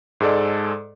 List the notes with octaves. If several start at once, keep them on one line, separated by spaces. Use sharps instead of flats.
G#2 G#3 A4 D5